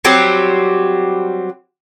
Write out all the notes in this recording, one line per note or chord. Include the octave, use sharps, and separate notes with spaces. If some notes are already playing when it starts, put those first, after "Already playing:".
F#3 G3 C4 G4